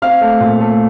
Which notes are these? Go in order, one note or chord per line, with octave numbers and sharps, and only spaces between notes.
C4 F5 F6
A3
A#2
A3